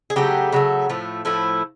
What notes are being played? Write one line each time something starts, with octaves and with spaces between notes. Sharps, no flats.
G#4
C#3 F#3 A3 G4
C#3 F#3 A3
A2 F3 A3
A2 F3 A3 E4